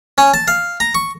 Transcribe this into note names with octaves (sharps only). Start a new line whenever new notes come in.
C#4
A5
F5
A#5
C#6